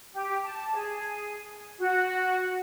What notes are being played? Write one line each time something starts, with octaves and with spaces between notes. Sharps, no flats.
G4
A5
G#4
F#4